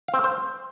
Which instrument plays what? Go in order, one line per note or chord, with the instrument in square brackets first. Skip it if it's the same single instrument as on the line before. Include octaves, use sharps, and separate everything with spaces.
[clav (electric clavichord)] F5
C4
F5
C5